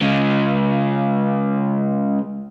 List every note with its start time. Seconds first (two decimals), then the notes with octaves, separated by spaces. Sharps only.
0.02 C#3 G#3